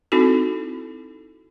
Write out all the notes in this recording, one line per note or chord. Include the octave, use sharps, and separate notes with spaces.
C4 D#4 E4 F#4 A4